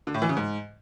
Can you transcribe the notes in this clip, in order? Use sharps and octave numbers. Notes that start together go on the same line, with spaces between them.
D3
A2
E3
C#3
G#2